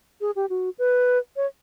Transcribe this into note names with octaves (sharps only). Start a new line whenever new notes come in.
G#4
G4
F#4
B4
C#5